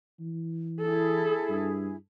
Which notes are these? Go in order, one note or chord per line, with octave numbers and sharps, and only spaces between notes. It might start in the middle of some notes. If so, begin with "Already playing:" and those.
E3
E4 G#4 A4
G2